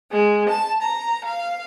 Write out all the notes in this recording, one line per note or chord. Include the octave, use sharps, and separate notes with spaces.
G#3
A5
A#5
F5